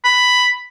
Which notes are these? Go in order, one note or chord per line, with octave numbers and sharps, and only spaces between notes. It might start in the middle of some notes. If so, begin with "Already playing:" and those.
B5